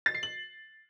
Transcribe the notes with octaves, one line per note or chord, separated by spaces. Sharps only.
A6
C7
F#7